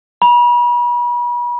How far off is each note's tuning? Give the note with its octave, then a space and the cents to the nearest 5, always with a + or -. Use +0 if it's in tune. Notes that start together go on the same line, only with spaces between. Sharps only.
B5 -40